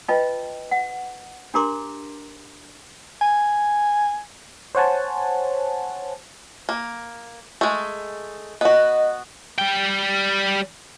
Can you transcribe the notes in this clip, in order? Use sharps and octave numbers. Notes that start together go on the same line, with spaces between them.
F4 B4 D#5 G5 A5
F#5
D4 G4 A#4 A#5 C6 D6
G#5
C5 C#5 F#5 G#5 A5
A#3
G#3 A3
B3 F#4 D#5
G3 G5